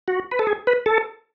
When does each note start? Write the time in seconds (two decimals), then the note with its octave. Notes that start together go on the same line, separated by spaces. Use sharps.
0.08 F#4
0.31 B4
0.39 A4
0.47 G#4
0.67 B4
0.86 A4